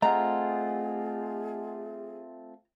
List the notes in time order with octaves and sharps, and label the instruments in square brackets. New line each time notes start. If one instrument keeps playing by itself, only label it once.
[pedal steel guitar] A3 C4 F4 [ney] G#4 [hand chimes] D#5 F#5 G#5 [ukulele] A#5